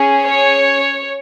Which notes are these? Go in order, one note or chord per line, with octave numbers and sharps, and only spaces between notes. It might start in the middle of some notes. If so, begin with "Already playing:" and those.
Already playing: C#4 G#4
C#5